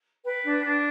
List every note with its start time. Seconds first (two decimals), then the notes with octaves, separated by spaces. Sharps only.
0.24 B4 G5
0.45 D4
0.65 D4